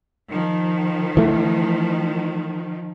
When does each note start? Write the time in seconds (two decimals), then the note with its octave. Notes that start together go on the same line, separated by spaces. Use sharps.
0.31 D#3 F3
1.17 E3 A3